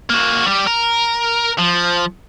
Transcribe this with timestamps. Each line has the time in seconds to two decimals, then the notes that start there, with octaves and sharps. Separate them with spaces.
0.10 A#3 F#4
0.46 G3 G4
0.67 A#4
1.58 F3